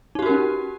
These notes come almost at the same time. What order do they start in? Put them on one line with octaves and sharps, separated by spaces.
D#4 G4 F#4 A#4 C#4